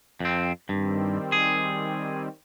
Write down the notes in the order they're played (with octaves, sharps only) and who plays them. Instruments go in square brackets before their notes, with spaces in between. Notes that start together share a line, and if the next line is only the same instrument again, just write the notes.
[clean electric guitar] F2 C4
[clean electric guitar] G2 [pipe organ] D#3 G3 C4
[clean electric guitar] G#4